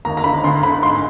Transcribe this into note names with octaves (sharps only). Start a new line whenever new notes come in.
D#2 A#5
A#5
D3 B5
D2 C6
D3 B5
G#2 C6